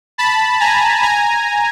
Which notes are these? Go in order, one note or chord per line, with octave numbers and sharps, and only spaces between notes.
A5 B5
G#5 A#5
G#5 A#5